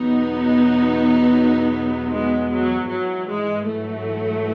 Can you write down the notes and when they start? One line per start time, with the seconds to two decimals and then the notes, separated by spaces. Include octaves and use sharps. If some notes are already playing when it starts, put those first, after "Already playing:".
Already playing: E2 B2 F#3 B3 D#4
2.11 G#3 B3
2.50 F#3
2.89 G#2 E3 F#3
3.29 G#3
3.67 F#3 A3